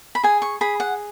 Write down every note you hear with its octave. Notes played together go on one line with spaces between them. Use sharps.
B5
G#4 G#5
C#6
G#4 B5
F#5